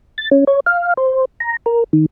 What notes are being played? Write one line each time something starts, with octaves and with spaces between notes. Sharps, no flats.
A6
C#4
C#5
F5
C5
A#5
A#4
D#3